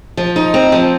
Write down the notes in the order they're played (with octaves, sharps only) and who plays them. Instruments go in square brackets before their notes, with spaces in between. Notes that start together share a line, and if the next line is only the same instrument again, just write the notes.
[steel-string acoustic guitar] F3
D#4
C4
F3